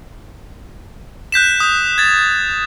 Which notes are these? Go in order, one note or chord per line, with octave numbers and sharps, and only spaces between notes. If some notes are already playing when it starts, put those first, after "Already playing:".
F#6 G6 B6 E7
D#6 G6
G#6 A6